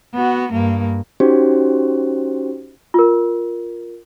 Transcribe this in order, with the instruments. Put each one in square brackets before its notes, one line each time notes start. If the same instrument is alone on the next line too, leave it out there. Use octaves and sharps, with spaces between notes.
[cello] B3 F#4
G2 A#3
[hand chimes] C#4 D#4 F#4 G4 C5
[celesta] F4 A#4